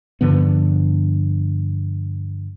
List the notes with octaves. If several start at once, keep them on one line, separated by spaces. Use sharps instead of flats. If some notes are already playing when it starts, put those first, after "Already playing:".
G2 D3 F3 B3